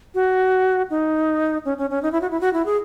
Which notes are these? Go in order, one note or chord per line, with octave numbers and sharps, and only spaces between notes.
F#4
D#4
C#4
C#4
C#4
D#4
E4
F#4
E4
F#4
E4
G#4